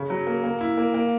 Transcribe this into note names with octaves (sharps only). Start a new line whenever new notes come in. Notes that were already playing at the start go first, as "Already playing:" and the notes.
Already playing: C#3
F#3
A#3
A#3
E4
A#3
A#3